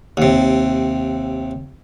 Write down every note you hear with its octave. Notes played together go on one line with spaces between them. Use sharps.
D#2 C3